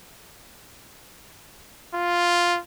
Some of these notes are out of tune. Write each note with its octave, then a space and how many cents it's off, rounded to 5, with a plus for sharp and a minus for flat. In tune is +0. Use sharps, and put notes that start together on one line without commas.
F4 +0